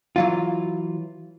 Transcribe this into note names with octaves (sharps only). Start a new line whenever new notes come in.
E3 F#3 F4